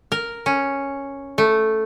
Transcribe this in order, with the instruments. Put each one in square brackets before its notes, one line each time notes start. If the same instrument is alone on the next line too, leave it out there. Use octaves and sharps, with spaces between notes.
[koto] A#4
C#4
A3